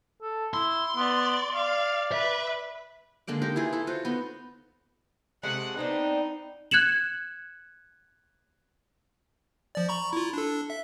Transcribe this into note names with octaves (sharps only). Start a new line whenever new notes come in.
A4
E4 C6
B3 D5
D5 F5
B4 E5
D3 G#3 A#3 D5
D#4 G4 A#4
E4 F4 G#4 B4
E4 A4
F4 F#4 C5
B3 D#4
C3 G#3 A3 F#5
B3 C4 D4 D#4
F#6 G#6 C#7 E7 F#7
F3 D5
A#5 B5 C#6
E4 F4
D4 A4
E5